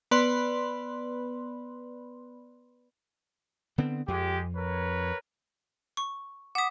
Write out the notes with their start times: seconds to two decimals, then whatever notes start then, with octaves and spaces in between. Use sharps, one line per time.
0.11 B3 B4 D5 B5 C6
3.78 D3 B3 C4
4.08 F2 G#3 G4
4.56 A#4 B4 C#5
5.97 C#6
6.55 F#5 D6 D#6 B6